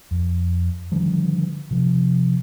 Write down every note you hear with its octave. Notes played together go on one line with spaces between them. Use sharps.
F2
D3 D#3 F3 G3
C3 F3